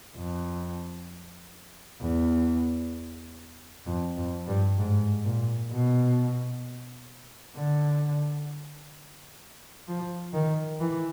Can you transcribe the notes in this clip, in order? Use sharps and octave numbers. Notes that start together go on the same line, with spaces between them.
F2
E2
F2
F2
G2
G#2
A#2
B2
D3
F3
D#3
E3